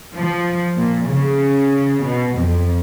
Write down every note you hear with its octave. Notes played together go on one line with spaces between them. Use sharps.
F3
A#2
C#3
B2
F2